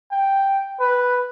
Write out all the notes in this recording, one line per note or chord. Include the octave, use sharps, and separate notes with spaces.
G5
B4